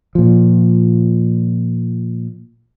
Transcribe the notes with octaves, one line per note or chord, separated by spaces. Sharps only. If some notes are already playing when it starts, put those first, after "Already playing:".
A#2 F3